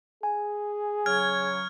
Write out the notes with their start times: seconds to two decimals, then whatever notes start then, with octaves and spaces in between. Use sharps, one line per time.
0.23 G#4 G#5
1.06 C#3 F#3 C#5 F6 G#6